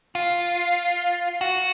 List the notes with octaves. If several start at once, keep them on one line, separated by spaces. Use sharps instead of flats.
F4
F#4